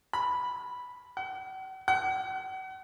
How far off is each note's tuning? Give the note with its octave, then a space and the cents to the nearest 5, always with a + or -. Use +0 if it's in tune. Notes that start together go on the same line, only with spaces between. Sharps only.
B5 -5
F#5 +45
F#5 +40